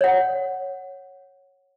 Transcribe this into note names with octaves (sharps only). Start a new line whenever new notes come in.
C#5 F#5